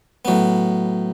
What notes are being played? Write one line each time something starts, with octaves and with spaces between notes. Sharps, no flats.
A2 F#3 B3